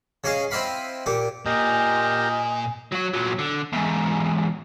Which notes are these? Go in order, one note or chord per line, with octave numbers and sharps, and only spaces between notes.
C#3 G#4 D#5 F5
C4 E4 D#5 F5 B5
A#2 G4
A#2 G4 A#4 D#5 G#5
F#3 F#4
A#2 F#3
D3
E2 G#2